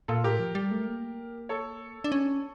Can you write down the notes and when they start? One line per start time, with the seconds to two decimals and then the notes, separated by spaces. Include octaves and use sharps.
0.08 A#2 F4 A4
0.24 A2 G4 A#4
0.39 F3
0.55 G3
0.71 A3
0.87 A#3
1.49 A4 C#5
2.04 D4
2.12 C#4